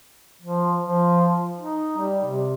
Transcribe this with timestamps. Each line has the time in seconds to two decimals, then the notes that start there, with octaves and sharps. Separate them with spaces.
0.42 F3
0.79 F3
1.58 D#4
1.97 G3
2.25 C3